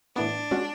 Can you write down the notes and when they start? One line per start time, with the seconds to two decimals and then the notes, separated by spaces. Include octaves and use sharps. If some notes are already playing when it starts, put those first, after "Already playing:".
0.16 A2 E3 B3 D4
0.51 G#3 C#4 F#4